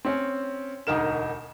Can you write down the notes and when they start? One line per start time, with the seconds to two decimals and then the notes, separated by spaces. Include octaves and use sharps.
0.05 C4 C#4
0.87 E1 D2 D#4 A#4 E7